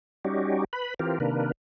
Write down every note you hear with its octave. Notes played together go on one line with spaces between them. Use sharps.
G3 C#4 D#4 F#4 G4
B4 B5
E3 C4 F4 G4 A#4
C3 D#3 A#3 D4 A#4 B4